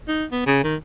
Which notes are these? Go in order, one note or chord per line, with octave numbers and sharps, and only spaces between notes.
D#4
B3
C#3
D#3